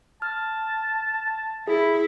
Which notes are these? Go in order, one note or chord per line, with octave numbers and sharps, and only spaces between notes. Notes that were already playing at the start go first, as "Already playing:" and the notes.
A5 F6
E4 G#4